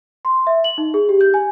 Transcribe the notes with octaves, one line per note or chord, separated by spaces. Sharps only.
C6
E5
F#7
D#4
G#4
G4
G6
G#5